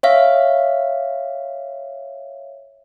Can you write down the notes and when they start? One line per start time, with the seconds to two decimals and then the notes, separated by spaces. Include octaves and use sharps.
0.03 C#5 E5 F5